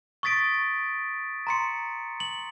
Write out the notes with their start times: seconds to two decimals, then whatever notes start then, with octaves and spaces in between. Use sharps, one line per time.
0.23 C#6 D#6 A6 B6 D7
1.47 A#5 C6 C#7
2.20 F#7